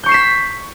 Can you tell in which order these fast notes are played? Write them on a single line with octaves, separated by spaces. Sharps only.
G6 C#6 C7 E7 B6